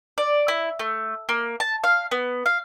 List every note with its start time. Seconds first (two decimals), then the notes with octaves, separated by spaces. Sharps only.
0.18 D5
0.48 E4
0.79 A3
1.29 A#3
1.60 A5
1.84 F5
2.11 B3
2.46 F5